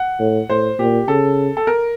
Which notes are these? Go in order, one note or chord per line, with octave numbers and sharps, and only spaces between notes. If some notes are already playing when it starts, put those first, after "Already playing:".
Already playing: F#5
A2
A2 C5
A#2 G4
C#3 A4
A4
A#4